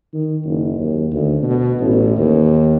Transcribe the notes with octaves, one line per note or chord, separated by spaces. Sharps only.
D#3
F#1
D#2
D2
B2
A1
D#2